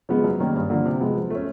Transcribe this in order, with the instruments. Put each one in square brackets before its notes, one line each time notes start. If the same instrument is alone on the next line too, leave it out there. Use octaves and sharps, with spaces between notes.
[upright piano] C#3 F3 G#3 B3
F#2
D#3 G3 A#3 C#4
G2
D3 F3 A#3
C3
F3 G#3 B3
F3
A3 C#4